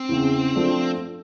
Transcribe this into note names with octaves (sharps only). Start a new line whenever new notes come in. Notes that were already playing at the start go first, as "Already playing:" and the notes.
Already playing: C4
E2 C#3 E3
F3 A3 D4